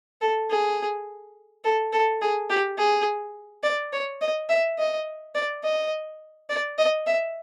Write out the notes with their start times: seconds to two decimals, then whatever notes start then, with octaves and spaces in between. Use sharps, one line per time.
0.21 A4
0.50 G#4
1.64 A4
1.93 A4
2.21 G#4
2.50 G4
2.78 G#4
3.63 D5
3.93 C#5
4.21 D#5
4.49 E5
4.79 D#5
5.35 D5
5.64 D#5
6.49 D5
6.78 D#5
7.07 E5